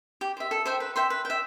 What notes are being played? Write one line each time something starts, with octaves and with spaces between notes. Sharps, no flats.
G4
C5 E5
A4
C5 E5 G5
B4
E5 G5 C6
B4
G5
E5